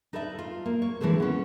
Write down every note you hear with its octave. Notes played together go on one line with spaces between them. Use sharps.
D#4 A4 B4 D5 E5
F4
A#3
C#5
D3 E3 G#3 B3 A4 C5
B3 C#4